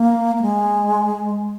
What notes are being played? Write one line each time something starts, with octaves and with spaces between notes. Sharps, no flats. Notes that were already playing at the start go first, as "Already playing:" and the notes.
Already playing: A#3
A#3
G#3